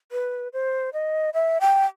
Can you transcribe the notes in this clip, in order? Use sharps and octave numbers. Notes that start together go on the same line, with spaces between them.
B4
C5
D#5
E5
G5